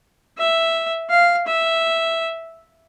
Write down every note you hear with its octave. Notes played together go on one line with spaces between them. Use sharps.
E5
F5
E5